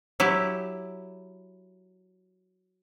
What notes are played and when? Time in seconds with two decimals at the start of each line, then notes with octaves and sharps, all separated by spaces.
0.20 F#3 E4 G4